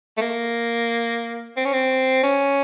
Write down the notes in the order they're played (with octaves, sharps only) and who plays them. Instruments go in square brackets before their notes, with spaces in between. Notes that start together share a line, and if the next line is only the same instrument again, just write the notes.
[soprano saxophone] A3
A#3
C4
C#4
C4
C#4